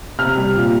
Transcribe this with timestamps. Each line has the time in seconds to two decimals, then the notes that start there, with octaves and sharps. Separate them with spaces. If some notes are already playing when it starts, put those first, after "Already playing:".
0.19 C3 F6
0.37 G3
0.56 A#2